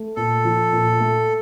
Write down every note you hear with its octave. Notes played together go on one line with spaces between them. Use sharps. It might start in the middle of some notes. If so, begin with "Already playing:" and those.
Already playing: A3
A#2 A4
F3
A#2
A3